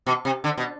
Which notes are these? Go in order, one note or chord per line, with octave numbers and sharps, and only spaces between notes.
B2
C3
D3
B2